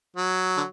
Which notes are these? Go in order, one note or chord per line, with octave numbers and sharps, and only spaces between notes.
F#3
D3